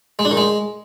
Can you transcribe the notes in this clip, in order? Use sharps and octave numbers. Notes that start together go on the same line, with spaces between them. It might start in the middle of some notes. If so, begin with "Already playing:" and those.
G#3
D4
D#3
G#3